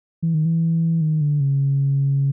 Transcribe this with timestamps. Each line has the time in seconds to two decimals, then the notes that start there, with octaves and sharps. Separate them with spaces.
0.22 E3
0.34 D#3
0.45 E3
1.01 D#3
1.21 D3
1.40 C#3